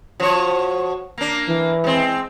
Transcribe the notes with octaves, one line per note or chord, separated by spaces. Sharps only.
F3 F#4 C#5
A#3 D4
E3
G#3 C4